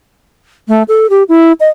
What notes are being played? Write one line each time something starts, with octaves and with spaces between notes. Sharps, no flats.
A3
A4
G4
E4
D#5